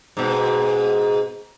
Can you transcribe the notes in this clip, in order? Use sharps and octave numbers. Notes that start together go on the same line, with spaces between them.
G#2 B2